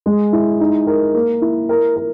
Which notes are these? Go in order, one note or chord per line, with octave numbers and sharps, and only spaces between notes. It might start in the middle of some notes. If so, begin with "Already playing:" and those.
G#3
E4
D#4
A#4
A#3
E4
A#4
A#4